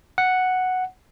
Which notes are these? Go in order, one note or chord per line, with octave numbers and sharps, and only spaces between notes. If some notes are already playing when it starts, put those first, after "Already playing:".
F#5